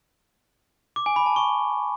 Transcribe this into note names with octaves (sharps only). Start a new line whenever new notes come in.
D6
G#5
B5
A5
C#6